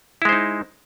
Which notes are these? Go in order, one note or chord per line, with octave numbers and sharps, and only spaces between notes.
G#3 D#4 E4 C5